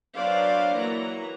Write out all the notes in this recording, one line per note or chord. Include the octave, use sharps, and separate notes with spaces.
F#3 D4 B4 C5 D5 F5
E3 F#3 A#3 F#4 A#5